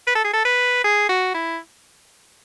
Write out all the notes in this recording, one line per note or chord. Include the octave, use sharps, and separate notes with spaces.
B4
A4
G#4
A4
B4
G#4
F#4
E4